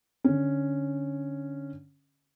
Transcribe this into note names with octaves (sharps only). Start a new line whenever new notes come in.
D3 C#4